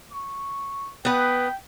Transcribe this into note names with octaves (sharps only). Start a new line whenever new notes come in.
C#6
B3 B4 G5